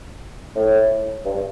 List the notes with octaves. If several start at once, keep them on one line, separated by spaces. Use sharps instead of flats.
A2
G2